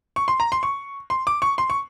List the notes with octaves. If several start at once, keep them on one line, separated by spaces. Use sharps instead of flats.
C#6
C6
A#5
C6
C#6
C6
D6
C#6
C6
C#6